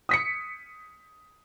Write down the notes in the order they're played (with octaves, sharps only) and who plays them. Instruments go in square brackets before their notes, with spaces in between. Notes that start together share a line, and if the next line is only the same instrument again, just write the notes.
[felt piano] D#6 B6 C#7